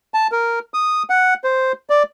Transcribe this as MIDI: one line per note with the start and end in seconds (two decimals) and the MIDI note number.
0.14 0.27 81
0.32 0.59 70
0.74 1.03 87
1.10 1.34 78
1.44 1.72 72
1.90 2.03 74